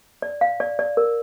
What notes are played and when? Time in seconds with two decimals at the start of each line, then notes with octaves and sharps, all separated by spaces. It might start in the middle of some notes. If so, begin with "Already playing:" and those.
0.22 D5
0.41 F5
0.60 D5
0.79 D5
0.97 A#4